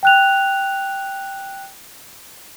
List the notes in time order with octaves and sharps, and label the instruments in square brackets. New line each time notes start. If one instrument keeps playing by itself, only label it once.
[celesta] G5 F#6 F7